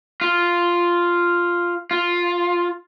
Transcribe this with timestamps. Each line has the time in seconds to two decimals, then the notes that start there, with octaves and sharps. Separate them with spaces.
0.21 F4
1.91 F4